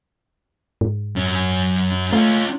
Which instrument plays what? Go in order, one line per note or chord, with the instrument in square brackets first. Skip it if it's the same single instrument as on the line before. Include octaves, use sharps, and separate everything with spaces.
[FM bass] G#2
[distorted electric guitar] F#2 C#4
[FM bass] A3 [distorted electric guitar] C#4 F4